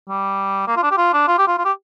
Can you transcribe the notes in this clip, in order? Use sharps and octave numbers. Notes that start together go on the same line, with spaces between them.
G3
A#3
F4
D4
G4
F4
D4
F4
G4
F4
F4
G4